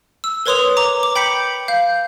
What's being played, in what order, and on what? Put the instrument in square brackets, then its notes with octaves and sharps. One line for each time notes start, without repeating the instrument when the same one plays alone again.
[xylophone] E6
A#4 B4 C#5 C6 D#6 F7
A#5 D6
D6
G5 B5 G6 B6 C#7 F#7
F5 G6